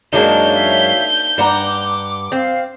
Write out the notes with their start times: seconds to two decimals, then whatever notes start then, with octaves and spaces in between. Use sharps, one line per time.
0.13 F#2 F#3 G#3 A#3 D4 D#4 G6
0.50 C#5 E5 F5
1.38 G2 F#5 A#5 D6
2.32 C4 F5